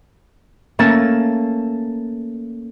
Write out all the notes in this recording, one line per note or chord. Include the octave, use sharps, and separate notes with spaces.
A3 A#3 C#4 A5 A6